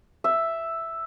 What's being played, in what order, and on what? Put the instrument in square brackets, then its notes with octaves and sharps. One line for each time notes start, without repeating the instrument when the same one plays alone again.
[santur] E5